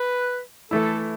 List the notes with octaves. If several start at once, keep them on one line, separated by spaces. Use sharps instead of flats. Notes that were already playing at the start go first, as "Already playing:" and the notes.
Already playing: B4
E3 A3 E4 A4